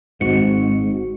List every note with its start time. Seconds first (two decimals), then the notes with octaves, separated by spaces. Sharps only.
0.21 G#1 G#2 C4 F#4 C#7